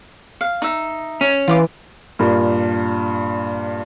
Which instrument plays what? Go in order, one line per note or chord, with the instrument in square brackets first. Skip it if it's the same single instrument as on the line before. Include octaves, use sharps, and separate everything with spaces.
[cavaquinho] F5
D#4 E5
[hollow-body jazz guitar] C#4
[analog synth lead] E3 [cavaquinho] F4 C6 D6
[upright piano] G2 A#2 A#4